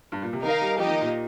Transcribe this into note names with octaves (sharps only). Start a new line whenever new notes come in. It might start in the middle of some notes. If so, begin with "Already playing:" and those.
G2
A#2
C3
D#3 D#4 A#4 F5
G3
F3 A#3 D#4 G4 D#5
D#3
A#2